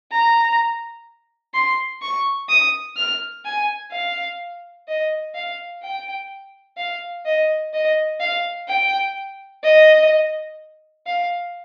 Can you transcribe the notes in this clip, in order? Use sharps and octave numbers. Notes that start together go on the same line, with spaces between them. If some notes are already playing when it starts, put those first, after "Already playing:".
A#5
C6
C#6
D#6
F6
G#5
F5
D#5
F5
G5
F5
D#5
D#5
F5
G5
D#5
F5